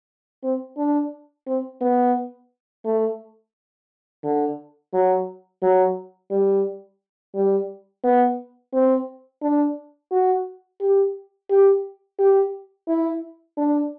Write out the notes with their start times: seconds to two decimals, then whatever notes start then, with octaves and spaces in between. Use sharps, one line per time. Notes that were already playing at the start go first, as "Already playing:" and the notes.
0.43 C4
0.78 D4
1.47 C4
1.81 B3
2.85 A3
4.24 D3
4.94 F#3
5.62 F#3
6.31 G3
7.35 G3
8.04 B3
8.74 C4
9.42 D4
10.12 F#4
10.81 G4
11.50 G4
12.19 G4
12.88 E4
13.58 D4